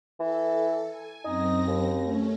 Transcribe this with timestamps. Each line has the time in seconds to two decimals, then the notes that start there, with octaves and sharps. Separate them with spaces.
0.20 E3 A4
0.88 G#5
1.25 F#2 C4 D#4 A#6
1.67 D#2
2.02 A3 C#4